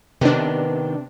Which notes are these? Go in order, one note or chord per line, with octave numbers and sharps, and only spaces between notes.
C3 D#3 B3 D4